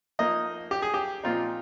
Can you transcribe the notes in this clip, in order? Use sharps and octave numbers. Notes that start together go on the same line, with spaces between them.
F3 A#3 D#4 D#5
G4
G#4
G4
A#2 F3 C4 D#4 F4